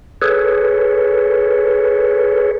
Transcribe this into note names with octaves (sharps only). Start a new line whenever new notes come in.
G#4 A4 B4 C#5